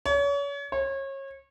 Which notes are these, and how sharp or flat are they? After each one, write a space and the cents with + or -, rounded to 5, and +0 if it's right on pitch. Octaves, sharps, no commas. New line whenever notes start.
C#5 +35
C#5 -30